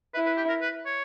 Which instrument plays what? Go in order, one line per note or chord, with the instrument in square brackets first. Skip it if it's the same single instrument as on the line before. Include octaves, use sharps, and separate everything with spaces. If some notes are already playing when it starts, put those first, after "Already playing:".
[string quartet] E4 [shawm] B4
[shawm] B4
G4
A#4
B4
C#5